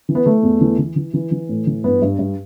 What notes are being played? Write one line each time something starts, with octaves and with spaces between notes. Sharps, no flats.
E3
B3
E3 A3
E2
E3
E3
E3
E3
E3
A2
E3
G2 B3
G2
G2